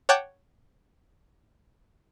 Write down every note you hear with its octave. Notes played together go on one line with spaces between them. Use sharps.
C#5 F#5 G5 A5 D6 G6